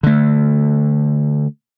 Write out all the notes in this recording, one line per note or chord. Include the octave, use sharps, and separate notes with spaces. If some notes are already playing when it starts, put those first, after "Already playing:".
D3 A3